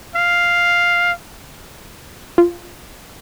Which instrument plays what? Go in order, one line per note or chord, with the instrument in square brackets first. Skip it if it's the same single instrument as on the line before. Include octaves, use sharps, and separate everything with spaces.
[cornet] F5
[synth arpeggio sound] F4